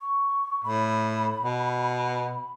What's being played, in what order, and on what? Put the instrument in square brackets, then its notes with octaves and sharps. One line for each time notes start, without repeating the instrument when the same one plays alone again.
[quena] C#6
[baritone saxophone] A2 [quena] B5
[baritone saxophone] B2